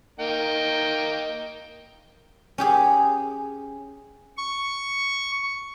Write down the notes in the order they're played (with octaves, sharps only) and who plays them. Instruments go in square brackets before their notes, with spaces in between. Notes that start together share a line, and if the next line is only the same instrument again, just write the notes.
[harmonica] A#3 D#4 G5
[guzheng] C#4 G4 G#4
[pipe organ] C#6